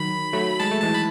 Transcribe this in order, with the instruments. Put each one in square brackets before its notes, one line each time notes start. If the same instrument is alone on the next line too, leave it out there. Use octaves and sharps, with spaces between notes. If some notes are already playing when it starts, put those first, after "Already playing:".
Already playing: [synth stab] D#3 F#3 [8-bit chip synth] B5
[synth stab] F#3 A3
[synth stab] G#3 [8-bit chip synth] A5
[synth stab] A3
[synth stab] E3 G#3 [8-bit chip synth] A5
[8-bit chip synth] B5